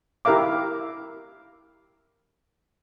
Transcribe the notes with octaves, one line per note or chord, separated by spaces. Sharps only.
E4 G4 A#4 E5 F5 D6